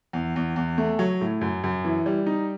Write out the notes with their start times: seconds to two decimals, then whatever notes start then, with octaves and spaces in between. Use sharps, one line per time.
0.13 E2
0.36 E2
0.56 E2
0.78 A3
0.99 F#3
1.21 A2
1.41 F#2
1.64 F#2
1.85 E3
2.06 G3
2.26 D#4